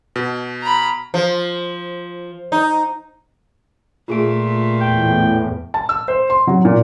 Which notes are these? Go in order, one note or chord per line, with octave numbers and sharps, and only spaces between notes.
B2
A#5 B5
F3
D#4
A#2 A3 F4 G#4 D7
E2 A2 G5
A5
E6
C5
C6
F#3
A#2